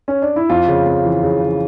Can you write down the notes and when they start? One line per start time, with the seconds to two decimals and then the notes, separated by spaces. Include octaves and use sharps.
0.08 C#4
0.22 D4
0.36 E4
0.49 F2 F4
0.68 C#3
0.86 F2
1.05 E3
1.23 C#3
1.42 C#3